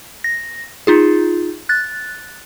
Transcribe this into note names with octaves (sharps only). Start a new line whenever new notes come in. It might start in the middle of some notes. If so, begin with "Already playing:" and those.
A#6
D#4 F4 G#4
F#6 A6